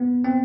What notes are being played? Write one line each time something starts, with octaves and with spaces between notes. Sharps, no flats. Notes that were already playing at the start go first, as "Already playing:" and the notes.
Already playing: B3
C4